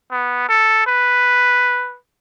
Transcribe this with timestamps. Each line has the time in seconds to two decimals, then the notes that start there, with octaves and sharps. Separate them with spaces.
0.11 B3
0.49 A4
0.87 B4